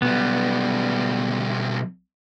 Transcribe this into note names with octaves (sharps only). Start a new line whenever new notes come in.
B1 G3 B3